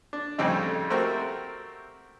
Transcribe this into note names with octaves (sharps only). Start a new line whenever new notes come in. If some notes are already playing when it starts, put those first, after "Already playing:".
D4
F2 A2 C#3 G3 C4 D#4
A3 C4 F#4 G4 A#4 C5